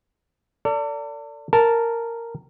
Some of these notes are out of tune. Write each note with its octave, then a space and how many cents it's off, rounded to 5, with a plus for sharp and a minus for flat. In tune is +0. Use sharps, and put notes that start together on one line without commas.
A4 +40 D5 -25
A#4 -10 A5 +0